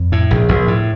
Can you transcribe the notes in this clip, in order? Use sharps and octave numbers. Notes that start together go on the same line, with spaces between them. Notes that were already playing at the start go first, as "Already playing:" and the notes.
Already playing: F2
A2
A#1
A#1
A2